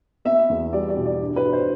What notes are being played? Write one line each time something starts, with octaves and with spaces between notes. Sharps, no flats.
B3 E5
E2
G3 D5
D5
B2
D5
G2
B4
G2
C5